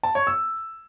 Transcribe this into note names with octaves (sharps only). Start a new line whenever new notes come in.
A5
C#5
E6